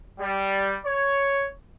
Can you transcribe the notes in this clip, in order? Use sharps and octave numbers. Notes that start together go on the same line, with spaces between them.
G3
C#5